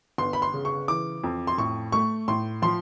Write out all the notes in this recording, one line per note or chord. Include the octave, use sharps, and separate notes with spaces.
G1 C6
B5
C6
C#3
C#6
E3 D6
F2
C6
A2 C#6
A3 C#6
A2 C6
F3 C6